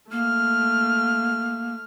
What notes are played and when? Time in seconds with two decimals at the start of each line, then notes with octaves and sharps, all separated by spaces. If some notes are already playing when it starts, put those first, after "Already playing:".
0.12 A3 A#3 F6